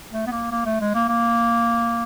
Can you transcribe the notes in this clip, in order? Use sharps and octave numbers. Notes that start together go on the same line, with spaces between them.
A3
B3
A#3
A#3
A3
G#3
A#3
A#3